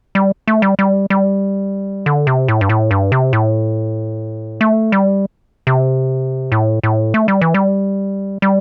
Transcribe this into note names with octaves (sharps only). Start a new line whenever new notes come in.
G3
A3
G3
G3
G3
D3
C3
A2
G2
A2
G2
C3
A2
A3
G3
C3
A2
A2
A3
G3
E3
G3
G3